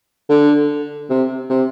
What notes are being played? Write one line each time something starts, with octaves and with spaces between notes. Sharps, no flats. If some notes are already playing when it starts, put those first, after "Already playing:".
D3
C3
C3